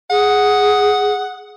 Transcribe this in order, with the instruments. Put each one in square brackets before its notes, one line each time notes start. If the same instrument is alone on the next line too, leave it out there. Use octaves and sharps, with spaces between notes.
[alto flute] G#4 [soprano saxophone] F#5